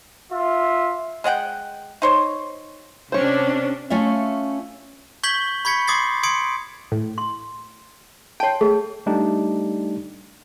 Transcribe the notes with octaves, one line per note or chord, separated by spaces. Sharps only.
F4 E5
G#3 D#5 F#5 G5
D#4 C5 C#5
C3 C#4 D4 C5 C#5
A3 C#4 F4 E5
C#6 G6 G#6 B6 F#7 G7
B5 C#6 G#6 B6 C#7
C6 D6 D#6 G#6 A6 C7
C6 D#6 G#6 C#7 D7
A2
C6
C#5 G5 A5 C6
A3 G#4
G3 A3 D4 D#4 G4